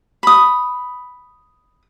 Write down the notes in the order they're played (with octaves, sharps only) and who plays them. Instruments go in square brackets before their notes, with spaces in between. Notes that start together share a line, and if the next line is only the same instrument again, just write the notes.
[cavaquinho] B5 D#6